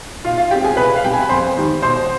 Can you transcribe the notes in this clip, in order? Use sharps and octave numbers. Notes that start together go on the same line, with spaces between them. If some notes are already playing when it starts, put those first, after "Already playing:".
B2 F4 F5
F4 F5
G#3 C4 G4 G5
G#4 G#5
C2 B4 B5
F5
B2 G3 C4 G5
G#5
B5
F2 C5 C6
D#3 G3
B2 C5 C6